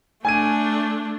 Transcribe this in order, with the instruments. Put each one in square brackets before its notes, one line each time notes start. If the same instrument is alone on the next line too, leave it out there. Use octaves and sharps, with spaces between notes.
[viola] A3 D4 [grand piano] G#5 G#6 D#7